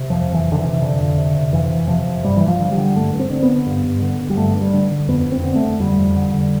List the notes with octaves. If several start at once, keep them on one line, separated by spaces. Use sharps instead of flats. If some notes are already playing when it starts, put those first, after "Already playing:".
Already playing: C3
F2 F3
F2
E3
C3
D3
E3
C3
F2 D3
F2
C3
C3
F2 E3
F2
C3 F3
C3
G2 G3
E3
G2
F3
D3
G3
D3
G2 A3
G2
C4
D3
B3
D3
G2
G2
D3
D3
G3
G2 A3
G2
G3
D3
D3
F2 B3
F2
C4
D3
A3
D3
F2 G3
F2
D3
D3